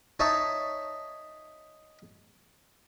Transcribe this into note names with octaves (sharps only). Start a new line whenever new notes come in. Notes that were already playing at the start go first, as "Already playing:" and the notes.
D#4 C#5 E5 A5